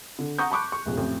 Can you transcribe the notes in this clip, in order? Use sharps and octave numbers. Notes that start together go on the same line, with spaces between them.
D3
F#5 A#5 C#6 D#6 G6
A5 B5 C#6 D6 F#6
C#6
F1 A#1
A1 F2